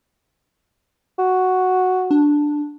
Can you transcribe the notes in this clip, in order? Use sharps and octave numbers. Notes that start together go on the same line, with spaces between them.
F#4
D4